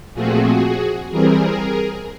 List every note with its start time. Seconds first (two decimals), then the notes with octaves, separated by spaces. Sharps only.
0.14 A#2 F3 A3 C4 F#4 G#4
1.11 E3 G3 C4 G#4 A#4